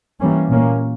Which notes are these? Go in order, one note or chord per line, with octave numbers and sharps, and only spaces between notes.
E3 G3 A#3 C#4
A#2 A#3 C#4